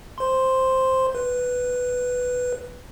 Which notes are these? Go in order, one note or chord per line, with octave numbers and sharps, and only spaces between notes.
C5 C6
B4